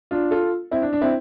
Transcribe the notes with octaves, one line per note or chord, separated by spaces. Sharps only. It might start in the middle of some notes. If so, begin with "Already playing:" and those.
D4 F4
F4 A4
C4 E4
D4
D4
C4 E4